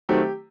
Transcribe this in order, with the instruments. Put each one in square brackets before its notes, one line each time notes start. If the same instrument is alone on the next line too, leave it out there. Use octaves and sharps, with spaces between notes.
[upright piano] D#3 F#3 A3 C4 G4